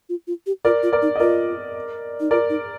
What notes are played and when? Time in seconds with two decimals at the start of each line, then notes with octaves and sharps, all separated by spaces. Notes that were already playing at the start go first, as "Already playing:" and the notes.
0.09 F4
0.27 F4
0.46 G4
0.65 F4 A#4 D5
0.83 F4
0.93 A#4 D5
1.02 D#4
1.16 D#5
1.20 F4 A#4 D5
2.20 D#4
2.31 F4 A#4 D5
2.50 D#4